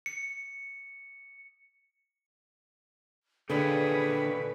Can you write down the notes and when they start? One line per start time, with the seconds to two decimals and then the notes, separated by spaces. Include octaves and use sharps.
0.06 C#7
3.50 A#2 D3 C#4 G4 G#4 B4